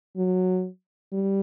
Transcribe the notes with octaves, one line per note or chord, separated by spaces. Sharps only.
F#3
G3